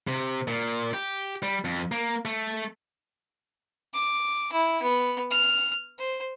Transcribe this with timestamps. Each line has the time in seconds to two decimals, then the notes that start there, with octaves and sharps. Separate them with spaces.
0.07 C3
0.48 A#2
0.94 G4
1.43 G3
1.65 F2
1.92 A#3
2.25 A3
3.94 D6
4.53 E4
4.83 B3
5.30 F6
5.99 C5